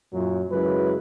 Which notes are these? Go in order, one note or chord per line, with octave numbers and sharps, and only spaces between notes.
F#2 A#2 F#3
F#2 C#3 F#3 G#3 E4 B4